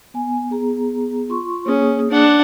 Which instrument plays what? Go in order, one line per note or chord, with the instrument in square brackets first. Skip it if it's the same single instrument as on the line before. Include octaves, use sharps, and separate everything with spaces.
[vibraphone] B3 G#5
B3 G#4 A#5
F4 C6 C#6
[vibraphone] A#3 G#4 D#6 [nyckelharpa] C#4
[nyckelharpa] D4 F#5